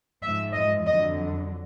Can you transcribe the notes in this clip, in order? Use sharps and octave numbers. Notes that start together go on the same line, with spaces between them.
G#2 F3 E5
D#5
F2 D3 F#3 D#5